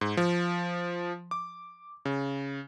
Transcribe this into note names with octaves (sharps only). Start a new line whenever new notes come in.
G#2
F3
D6
C#3